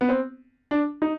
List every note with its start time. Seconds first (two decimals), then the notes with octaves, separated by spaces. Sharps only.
0.01 B3
0.09 C4
0.71 D4
1.02 D#4